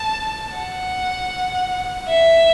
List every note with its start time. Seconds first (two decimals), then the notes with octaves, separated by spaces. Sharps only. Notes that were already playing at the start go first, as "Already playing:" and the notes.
Already playing: A5
0.56 F#5
2.09 E5